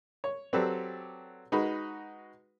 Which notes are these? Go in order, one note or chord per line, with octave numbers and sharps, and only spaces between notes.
C#5
F#3 C4 G4 A4 B4 D5
G#3 D#4 F#4 B4 B5